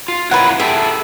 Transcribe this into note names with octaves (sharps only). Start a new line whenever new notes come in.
F4
E4 A#4 B4 C#5 F#5
G#4 A4 E5 G5